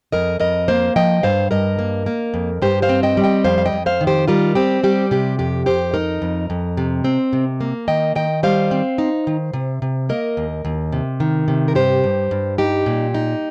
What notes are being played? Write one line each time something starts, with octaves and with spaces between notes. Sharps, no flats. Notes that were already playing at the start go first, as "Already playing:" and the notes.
F2 A#4 D#5
F2 A#4 D#5
A#3 C5 F5
F3 D#5 G5
G2 C5 F5
G2 A#4 D#5
A#3
A#3
F2
G2 G4 C5
C5 F5
C4
D#5 G5
G3
D#5 G5
F2 C5 F5
F5
D#5 G5
F2
C5 F5
D#3
G4 C5
G3 F4 A#4
C4 G4
G3 G4
C3 G4
F2 G4
F2 G4 C5
D#4 A#4 D#5
F2
F2
C3
C4
C3
A#3
D#3 D#5 G5
D#3 D#5 G5
G3 C5 F5
C4
D#4
D#3
C3
C3
A#3 A#4 D#5
D#2
D#2
C3
D#3
C3
A#4
G2 G4 C5
G2
G2
D#4 G4
A#2
D#4